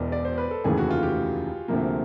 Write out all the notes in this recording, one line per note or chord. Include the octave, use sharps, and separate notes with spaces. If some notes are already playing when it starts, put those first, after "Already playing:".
Already playing: E1 E2 B2 A#4 D5 D#5
D5
C5
B4
A4
F1 D#2 C#3 E3 A3 G#4
F#4
F4
G4
D2 C3 F3 A#3